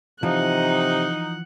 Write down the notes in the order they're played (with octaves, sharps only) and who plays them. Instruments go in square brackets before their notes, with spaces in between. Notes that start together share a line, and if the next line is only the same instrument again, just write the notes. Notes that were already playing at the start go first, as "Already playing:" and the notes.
[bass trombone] C3 [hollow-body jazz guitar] E3 F3 [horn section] D#4 [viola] F#5